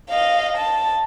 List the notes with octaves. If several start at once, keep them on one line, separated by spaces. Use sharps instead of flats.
D#5 F5
A5